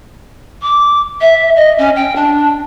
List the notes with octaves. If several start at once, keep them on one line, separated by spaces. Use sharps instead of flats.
D6
E5
D#5
C#4
G5
D4